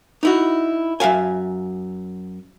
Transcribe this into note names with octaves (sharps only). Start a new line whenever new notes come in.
D#4 E4 F#4
F#2 E5 F5 G#5